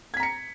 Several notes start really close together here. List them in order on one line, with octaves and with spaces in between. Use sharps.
G#6 B6 A#5 C#7